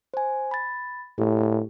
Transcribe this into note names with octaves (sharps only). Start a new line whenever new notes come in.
C5 G#5
B5 A6
A2 G4